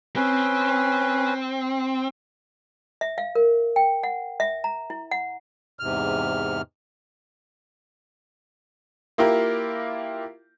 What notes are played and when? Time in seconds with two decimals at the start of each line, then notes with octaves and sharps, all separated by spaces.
0.16 C4 C#4 B4
3.01 E5
3.18 F5
3.35 A#4
3.76 G5
4.03 F#5
4.40 E5
4.64 A#5
4.90 E4
5.11 F#5
5.79 E2 G#2 C3 F6
9.18 A#3 E4 F4 G4 A#4